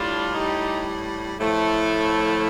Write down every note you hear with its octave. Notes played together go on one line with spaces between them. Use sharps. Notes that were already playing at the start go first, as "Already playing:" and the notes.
Already playing: A2 G3 D4 F4
D#4 G4
A2 F3 A3